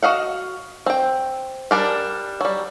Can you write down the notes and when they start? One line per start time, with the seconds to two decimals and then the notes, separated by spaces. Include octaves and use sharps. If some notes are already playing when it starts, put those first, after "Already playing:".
0.03 F#4 D#5 F5 F#5
0.86 C4 G5
1.71 G3 D4 A#4
2.41 F#3 G3